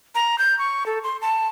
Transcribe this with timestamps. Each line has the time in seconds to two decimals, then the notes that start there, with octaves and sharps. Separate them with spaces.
0.15 A#5
0.38 G6
0.59 C#6
0.86 A4
1.04 C6
1.22 A5